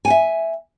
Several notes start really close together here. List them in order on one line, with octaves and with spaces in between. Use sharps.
G#5 F#5 E5